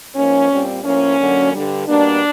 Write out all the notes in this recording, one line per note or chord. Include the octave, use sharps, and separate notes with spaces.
G#2 F3 A#3 C#4
A#2 G3 C4
A2 F3 A#3 C#4
F#2 D3 F#3 A#3
G2 D3 G3
B2 G3 A#3 D4